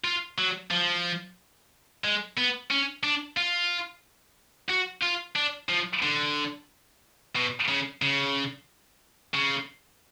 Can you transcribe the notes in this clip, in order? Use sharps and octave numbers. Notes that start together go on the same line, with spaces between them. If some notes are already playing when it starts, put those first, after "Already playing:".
F4
F#3
F3
G#3
B3
C#4
D4
F4
F#4
F4
D4
F3
D3
B2
C#3
C#3
C#3